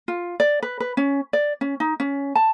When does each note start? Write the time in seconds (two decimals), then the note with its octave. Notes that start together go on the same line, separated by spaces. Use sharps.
0.08 F4
0.40 D5
0.63 B4
0.80 B4
0.97 C#4
1.33 D5
1.61 C#4
1.80 D#4
2.00 C#4
2.35 A5